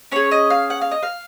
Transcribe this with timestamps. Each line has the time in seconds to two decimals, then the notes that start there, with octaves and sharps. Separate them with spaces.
0.12 C#4 G#4 C#5
0.31 D#5
0.50 F5
0.70 F#5
0.81 F5
0.91 D#5
1.03 F5